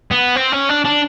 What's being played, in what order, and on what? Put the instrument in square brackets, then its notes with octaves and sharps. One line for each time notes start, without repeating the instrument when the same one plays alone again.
[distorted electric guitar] B3
C4
C#4
D4
D4